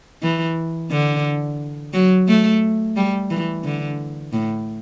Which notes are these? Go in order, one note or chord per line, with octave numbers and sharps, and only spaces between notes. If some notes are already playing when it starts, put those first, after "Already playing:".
E3
D3
F#3
A3
G3
E3
D3
A2